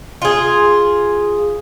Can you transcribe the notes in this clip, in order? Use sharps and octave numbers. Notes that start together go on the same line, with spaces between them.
F4 G#4